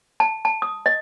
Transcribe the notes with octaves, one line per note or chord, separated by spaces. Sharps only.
A5
A5
D#6
D#5